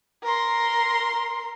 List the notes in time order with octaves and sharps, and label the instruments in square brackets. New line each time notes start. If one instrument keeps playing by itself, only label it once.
[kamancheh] A#4 C6